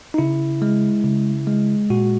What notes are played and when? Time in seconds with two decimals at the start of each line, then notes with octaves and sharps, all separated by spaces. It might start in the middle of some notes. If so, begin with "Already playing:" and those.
0.14 D#4
0.18 C#3 E4
0.62 G#3
1.04 C#3
1.47 G#3
1.90 A#2 F#4